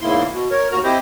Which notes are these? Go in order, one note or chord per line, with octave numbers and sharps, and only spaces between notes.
E2 G#2 C#3 A#3 E4 C6
B2
A#4 C#5
D#2 F#4 A#4 A#5
C4 E4 G4 C5 D#5